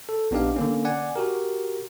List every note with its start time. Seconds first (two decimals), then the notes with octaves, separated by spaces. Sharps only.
0.09 A4
0.31 A#1 B3 D4 D#4 G4 F5
0.56 D3 A#3 C#4
0.85 D5 F#5 G#5
1.16 F#4 G4 A#4